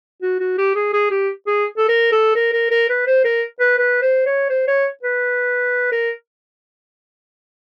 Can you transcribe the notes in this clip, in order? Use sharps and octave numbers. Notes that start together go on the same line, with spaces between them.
F#4
F#4
G4
G#4
G#4
G4
G#4
A4
A#4
A4
A#4
A#4
A#4
B4
C5
A#4
B4
B4
C5
C#5
C5
C#5
B4
A#4